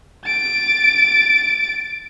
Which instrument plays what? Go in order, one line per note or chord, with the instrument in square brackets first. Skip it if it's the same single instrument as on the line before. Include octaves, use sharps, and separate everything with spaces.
[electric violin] A6 D7